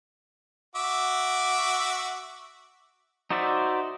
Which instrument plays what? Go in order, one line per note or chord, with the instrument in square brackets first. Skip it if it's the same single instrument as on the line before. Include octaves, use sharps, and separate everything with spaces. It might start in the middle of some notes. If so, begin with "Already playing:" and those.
[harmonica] F#4 E5 D6
[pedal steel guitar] D#4 F#4 C5 D5 E5